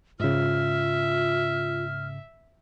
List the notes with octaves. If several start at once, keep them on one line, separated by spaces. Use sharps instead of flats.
G#2 C#3 F4 E5 F6